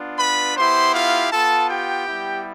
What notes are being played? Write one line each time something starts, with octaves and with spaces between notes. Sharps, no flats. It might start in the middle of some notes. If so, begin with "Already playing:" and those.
Already playing: B3 D4 F4
B4 B5
B3 E4 G4 C5 C6
F4 F5
B3 F4 A4 A5
G4 G5
G3 B3 E4